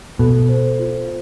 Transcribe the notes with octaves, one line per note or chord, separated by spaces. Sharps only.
B2 A4
C5
F4